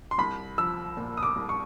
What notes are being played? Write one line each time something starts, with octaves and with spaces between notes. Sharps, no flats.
C6
C2 B5
F3 E6
A#2
D#6
D6
C2
C#6